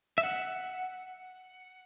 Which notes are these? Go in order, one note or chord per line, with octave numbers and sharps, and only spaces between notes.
E5
F#5